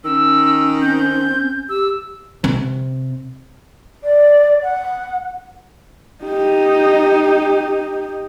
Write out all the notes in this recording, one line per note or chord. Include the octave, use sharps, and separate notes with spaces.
D#3 C#4 E6
C4 G6
G4 E6
C3
D5
F#5
D#4 G4